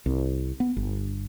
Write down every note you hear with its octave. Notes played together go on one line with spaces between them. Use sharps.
C2
B3
G1